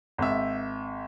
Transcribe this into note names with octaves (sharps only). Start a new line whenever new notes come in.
G#1 E5